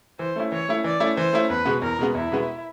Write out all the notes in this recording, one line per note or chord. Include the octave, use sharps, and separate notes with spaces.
E3 C5
A3 C#4 E4
E3 C#5
A3 C#4 E4
E3 D5
A3 C#4 E4
E3 C5
A3 C#4 E4
E2 B4
B2 G#3 B3
E2 A#4
B2 G#3 B3
E2 E4
B2 G#3 B3